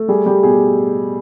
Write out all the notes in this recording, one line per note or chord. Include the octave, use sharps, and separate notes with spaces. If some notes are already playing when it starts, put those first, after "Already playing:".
Already playing: A3
G3 G#4
G3 G4
B2 G#4